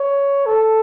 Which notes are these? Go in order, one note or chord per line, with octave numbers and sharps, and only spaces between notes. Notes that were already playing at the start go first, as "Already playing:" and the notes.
Already playing: C#5
A4